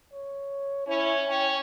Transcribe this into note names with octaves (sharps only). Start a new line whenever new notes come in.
C#5
C#4 E4 C#5
C#4 G5